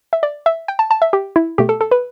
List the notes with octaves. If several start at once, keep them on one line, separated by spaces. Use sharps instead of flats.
E5
D5
E5
G5
A5
A5
E5
G4
E4
B2 A3 G4
A4
A4
B4